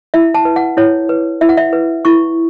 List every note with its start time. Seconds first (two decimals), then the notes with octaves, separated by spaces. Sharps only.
0.14 E4 E5
0.34 A5
0.45 B4
0.56 F#5
0.77 E4 C#5
1.09 B4
1.41 E4 E5
1.49 F#5
1.57 E5
1.73 B4
2.05 E4 C#6